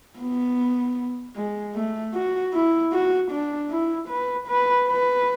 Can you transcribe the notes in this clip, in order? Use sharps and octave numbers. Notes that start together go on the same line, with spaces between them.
B3
G#3
A3
F#4
E4
F#4
D4
E4
B4
B4
B4